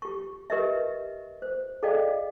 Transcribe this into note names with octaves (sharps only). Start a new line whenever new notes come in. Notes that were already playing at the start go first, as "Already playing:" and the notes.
G4 C#6
G4 A#4 B4 D#5 E5
C5
G#4 A4 D5 D#5 F5 G5